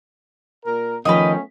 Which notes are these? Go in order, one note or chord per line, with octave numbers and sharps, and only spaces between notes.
A#2 A#4
D#3 F3 A3 B3 C#4 B4 D#5